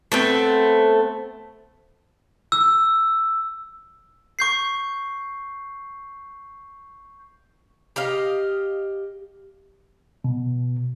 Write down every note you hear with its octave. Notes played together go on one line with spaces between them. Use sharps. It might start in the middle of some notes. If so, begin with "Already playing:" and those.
A3 B3 C4
E6
C#6 G6 C7
G4 D#5 F5
B2